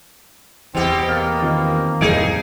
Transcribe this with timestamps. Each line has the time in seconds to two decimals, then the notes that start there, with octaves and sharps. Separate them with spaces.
0.75 E2 B2 E3 C4 G4
1.09 A#3 F6 A6
1.42 D#3 C4 F4
2.01 F1 A2 E3 G3 D#4 G#4 G#6 D7